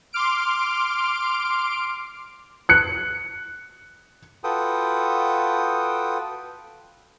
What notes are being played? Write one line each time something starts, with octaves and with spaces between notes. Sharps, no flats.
C6 D6 F6 D7
F#6 C#7
F4 F#4 A4 B4 G5 D#6